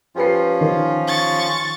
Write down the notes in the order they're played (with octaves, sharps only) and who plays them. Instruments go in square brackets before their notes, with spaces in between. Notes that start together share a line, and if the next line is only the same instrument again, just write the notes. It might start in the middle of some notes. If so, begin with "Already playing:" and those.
[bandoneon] F3 C#4 F4 [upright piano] G4 B4 C7
[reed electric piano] D#3
[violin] C#6 A6